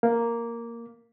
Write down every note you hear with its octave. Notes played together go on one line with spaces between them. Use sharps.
A#3